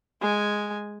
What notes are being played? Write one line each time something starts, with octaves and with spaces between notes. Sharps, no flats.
G#3 G#5